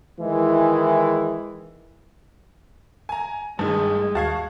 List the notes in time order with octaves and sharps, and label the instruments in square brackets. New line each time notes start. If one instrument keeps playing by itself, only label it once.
[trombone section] D#3 E3 G#3 E4
[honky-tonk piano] G#5 A#5
[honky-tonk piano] A1 D#3 [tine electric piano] G2 A5 [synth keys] G3 [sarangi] G#3
[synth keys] D#2 [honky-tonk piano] F#4 F5 [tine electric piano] A5 C#6 G#6